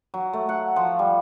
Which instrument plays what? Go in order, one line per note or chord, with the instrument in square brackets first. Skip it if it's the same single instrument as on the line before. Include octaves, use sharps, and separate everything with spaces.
[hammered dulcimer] F#3
A3
F#5
F3
G3